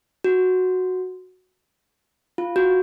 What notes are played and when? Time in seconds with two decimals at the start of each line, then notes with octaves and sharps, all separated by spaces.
0.24 F#4
2.38 F4
2.56 F#4